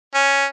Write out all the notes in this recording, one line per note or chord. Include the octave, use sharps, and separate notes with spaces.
C#4